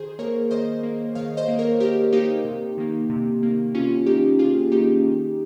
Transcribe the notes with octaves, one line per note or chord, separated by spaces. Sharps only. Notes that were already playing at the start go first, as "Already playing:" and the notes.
Already playing: D#3 G#4 C5
A#3 A#4 C#5
D#3 C5 D#5
A#3
D#3 C#5 F5
C5 D#5
A#3
A#4 C#5
D#3 G4 A#4
A#3 D#4 G4
C3
D#3 A#3
C3
D#3 A#3
C3 C#4 F4
D#3 A#3 D#4 G4
C3 F4 G#4
D#3 A#3 D#4 G4
D#3